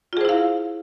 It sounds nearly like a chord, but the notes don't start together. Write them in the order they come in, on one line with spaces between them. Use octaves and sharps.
F4 G#4 C5 E4 F5